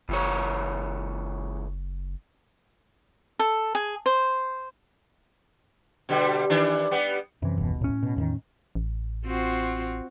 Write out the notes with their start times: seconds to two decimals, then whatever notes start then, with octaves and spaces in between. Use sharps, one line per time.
0.09 F#1 C#2 E3 C#5
3.39 A4
3.75 G#4
4.06 C5
6.09 B2 D3 G3
6.50 D#3 E3 D4
6.91 G3 B3
7.42 F#2 C3 E3
7.58 D#1 B1 B2
7.81 A2 C#4
8.03 B2
8.16 E2 D3 D#3
8.75 A1
9.26 C4 F4 F#4